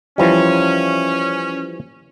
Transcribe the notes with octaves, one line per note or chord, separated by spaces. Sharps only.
E3 F3 G3 C#4